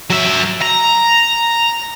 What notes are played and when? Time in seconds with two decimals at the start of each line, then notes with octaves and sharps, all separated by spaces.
0.10 F#3 E5
0.61 A#5